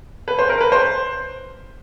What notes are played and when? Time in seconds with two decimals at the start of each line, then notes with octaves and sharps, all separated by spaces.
0.28 B4
0.39 C5
0.49 A#4
0.61 B4
0.72 C5